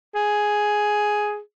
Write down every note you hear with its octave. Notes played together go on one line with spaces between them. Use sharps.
G#4